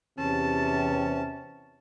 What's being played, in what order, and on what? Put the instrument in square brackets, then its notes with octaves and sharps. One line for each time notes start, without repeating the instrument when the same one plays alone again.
[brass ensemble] E2 C3 [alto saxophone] C#4 [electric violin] A5